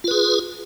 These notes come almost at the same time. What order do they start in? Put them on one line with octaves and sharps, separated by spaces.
F4 B4 G#4